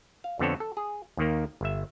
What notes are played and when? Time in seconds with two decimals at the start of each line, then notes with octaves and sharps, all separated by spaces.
0.24 F5
0.39 F2 D3 B3 C4 A4 C#5
0.60 A4
0.77 G#4
1.17 D#2 D#3 A#3
1.61 G1 E5